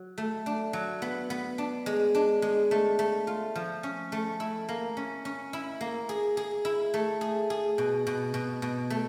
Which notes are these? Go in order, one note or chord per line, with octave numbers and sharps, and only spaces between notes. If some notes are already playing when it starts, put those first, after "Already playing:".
Already playing: F#3
A3
D4
F#3
B3
B3
D4
G#3
D4
G#3
A3
A3
F4
F3
C#4
A3
E4
A#3
C#4
C#4
E4
A#3
G#4
G#4
E4
A3
G#4
G#4
B2
B2
B2
B2
A3